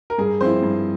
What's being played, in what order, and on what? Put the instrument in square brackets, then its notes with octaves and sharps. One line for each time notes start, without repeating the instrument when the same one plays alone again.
[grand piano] A#4
G2 G#4
F3 C4 E4 C5
G2